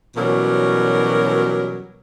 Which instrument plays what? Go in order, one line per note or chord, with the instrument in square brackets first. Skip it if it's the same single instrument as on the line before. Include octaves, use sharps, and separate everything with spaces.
[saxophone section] B2 E3 F#3 G3 C#4 A#4